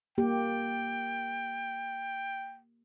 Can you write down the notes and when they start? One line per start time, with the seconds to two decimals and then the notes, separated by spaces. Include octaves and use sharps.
0.18 A#3 G4 G5